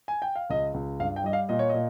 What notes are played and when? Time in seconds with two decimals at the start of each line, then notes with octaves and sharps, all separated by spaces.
0.08 G#5
0.22 G5
0.36 F5
0.50 C#2 D#5
0.74 C#2
0.99 G2 F5
1.16 G5
1.24 G3 D#5
1.33 F5
1.49 A#2 D#5
1.59 C#5
1.69 A#2 D#5